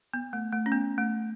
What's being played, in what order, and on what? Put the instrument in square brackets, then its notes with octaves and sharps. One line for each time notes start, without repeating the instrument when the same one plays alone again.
[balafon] B3
A3
A3
C#4
B3
A3